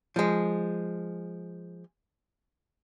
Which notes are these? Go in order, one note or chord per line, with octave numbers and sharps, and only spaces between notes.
F3 G#3